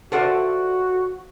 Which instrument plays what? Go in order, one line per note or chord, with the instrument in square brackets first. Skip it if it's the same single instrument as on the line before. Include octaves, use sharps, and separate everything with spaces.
[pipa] F4 C5 E5 [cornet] F#4 [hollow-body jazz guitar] A4 D5 F#5